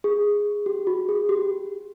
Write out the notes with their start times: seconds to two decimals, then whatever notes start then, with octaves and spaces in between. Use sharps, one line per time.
0.04 G#4
0.66 G4
0.87 F#4
1.09 G#4
1.29 G4